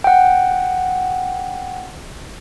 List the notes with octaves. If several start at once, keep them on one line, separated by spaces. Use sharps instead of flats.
F#5 G5